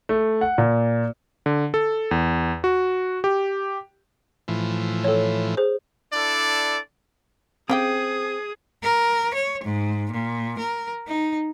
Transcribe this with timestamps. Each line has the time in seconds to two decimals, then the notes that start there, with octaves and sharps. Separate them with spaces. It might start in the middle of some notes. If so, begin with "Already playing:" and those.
0.09 A3
0.41 F#5
0.58 A#2
1.46 D3
1.74 A4
2.11 E2
2.64 F#4
3.24 G4
4.48 A2 E3 F3
5.04 A4 C#5
5.57 G#4 C5
6.13 D4 E4 A4 D5
7.70 C#3 C4 G4 G#4 G5 D#6
8.83 A#4
9.34 C#5
9.64 G#2
10.11 A#2
10.59 A#4
11.08 D#4